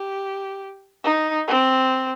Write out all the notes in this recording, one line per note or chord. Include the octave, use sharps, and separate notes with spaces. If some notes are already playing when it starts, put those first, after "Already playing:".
Already playing: G4
D#4
C4